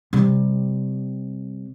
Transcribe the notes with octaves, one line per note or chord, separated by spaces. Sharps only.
C3 G3